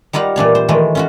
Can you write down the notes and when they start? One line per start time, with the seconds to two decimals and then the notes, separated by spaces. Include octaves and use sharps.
0.13 G3 D#4 F4 F5 F#5
0.36 A#2 E3 D4 C#5
0.55 C5
0.68 D#3 E3 G#3 A3
0.95 C#4 F4 F#4